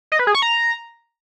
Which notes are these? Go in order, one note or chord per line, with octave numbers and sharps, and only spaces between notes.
D#5
B4
G#4
C#6
A#5